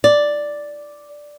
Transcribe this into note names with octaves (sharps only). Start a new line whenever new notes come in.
D5